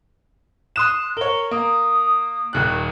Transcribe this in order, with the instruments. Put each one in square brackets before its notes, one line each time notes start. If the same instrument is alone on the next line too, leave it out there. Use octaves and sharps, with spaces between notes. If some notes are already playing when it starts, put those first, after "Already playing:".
[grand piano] C6 D#6 E7 [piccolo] F#6
[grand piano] A#4 C#5 [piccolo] G7
[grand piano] A#3 [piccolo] D#6
[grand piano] D#1 D#2 F#6